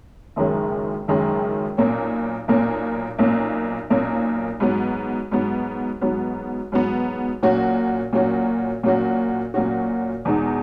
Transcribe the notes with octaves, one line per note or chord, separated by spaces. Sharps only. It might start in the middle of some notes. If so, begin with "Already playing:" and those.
F#1 F#2 D#3 G#3 C#4
F#1 F#2 D#3 G#3 C#4
B1 A#2 A#3 C#4
B1 A#2 A#3 C#4
B1 A#2 A#3 C#4
B1 A#2 A#3 C#4
G#2 F#3 B3
G#2 F#3 B3
G#2 F#3 B3
G#2 F#3 B3
A#2 F#3 C#4 F#4
A#2 F#3 C#4 F#4
A#2 F#3 C#4 F#4
A#2 F#3 C#4 F#4
E2 B2 G#3 D#4 F#4